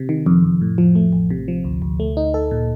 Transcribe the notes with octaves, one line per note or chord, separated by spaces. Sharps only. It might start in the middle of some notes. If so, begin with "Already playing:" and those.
Already playing: C3
D#3
F2
F2
A2
F3
A3
A1
C3
F3
D2
D2
A3
D#4
A4
A#2